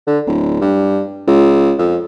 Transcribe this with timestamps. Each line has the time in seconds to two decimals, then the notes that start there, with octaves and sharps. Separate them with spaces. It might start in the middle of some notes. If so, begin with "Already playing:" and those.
0.07 D3
0.27 D1
0.61 G2
1.27 C#2
1.78 F2